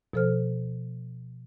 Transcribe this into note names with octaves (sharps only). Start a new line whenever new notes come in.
B2 F3 A4 C5 F6